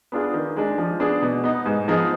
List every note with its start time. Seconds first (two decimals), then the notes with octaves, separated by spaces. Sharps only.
0.12 B3 D4 F4 G#4
0.34 D#3
0.56 G#3 D4
0.78 F3
1.00 B3 D4 G#4
1.22 B2
1.44 B3 D#4
1.66 G#2
1.88 F3 B3 D#4 G#4